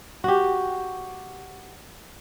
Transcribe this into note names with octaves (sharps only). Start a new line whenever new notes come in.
F#4 G4